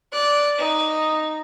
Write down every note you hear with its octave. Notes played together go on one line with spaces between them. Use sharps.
D5 F#6
D#4